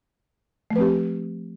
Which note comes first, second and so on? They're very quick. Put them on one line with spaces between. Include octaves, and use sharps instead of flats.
A3 F3 B4 C4 G4